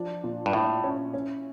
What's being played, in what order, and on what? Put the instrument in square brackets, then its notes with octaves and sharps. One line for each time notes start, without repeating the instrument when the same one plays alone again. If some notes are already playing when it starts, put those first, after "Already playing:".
Already playing: [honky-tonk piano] F3 D4
A#2
[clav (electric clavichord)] G2
[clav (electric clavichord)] A2 [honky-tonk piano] E4
[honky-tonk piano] C#4
C#4